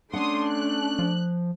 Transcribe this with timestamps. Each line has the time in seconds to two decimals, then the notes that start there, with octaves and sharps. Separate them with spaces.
0.13 A3 C#4 D4 F#5 C6 D#6
0.49 F#6
0.99 F3